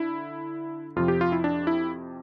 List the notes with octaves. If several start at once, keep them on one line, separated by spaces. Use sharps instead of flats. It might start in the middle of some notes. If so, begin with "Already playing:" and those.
Already playing: D3 E4
F2 C3 F3 F4
G4
F4
E4
D4
E4